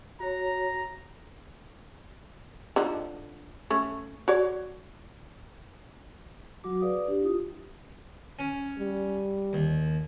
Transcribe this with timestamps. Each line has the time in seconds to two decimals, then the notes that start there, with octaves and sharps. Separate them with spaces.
0.20 F#4 C#5 A#5
2.76 D3 F3 D#4
3.70 A3 C#4
4.28 F#4 C#5 D5
6.64 F#3 F#4 D6
6.82 G#4 B4 D5 F5 D#6
7.08 D4 G4
7.21 E4 F4 D#6
8.39 C#4
8.79 G3
9.53 D#2